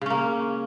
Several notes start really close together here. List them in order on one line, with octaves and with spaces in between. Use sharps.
C#3 C#4 A#3